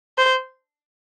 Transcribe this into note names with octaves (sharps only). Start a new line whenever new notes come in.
C5